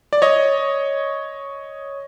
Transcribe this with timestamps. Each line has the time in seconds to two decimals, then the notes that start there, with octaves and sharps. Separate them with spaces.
0.13 D5
0.22 C#5 D#5